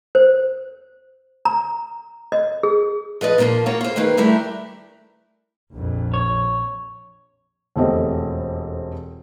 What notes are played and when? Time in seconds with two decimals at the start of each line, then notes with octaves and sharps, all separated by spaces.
0.15 C5
1.45 A#5
2.32 D#5
2.63 G#4
3.21 F3 B4 D5 D#5
3.38 A#2 F3 A#3 D4 F4
3.66 A#3 F4 F#4 C#5
3.81 F4 C5
3.96 D#3 A#3 B4 C5 G5
4.17 G3 A3 D4 E4 G4 A#4
5.74 A#1 F2
6.14 C#5
7.76 E1 F2 A3 C4 G4 D#5